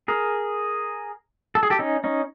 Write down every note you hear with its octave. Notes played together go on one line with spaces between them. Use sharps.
G#4 A#4
A4
G#4
G4 A4
C#4 D#4
C#4 D#4